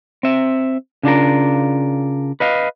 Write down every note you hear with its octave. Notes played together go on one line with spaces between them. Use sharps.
C4 E5
C#3 D4 F4 A#4
B4 D#5 F5